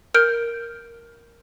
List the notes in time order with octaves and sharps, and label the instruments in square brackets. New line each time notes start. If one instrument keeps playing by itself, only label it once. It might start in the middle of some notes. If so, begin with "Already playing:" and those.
[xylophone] A#4 F6 G6 D7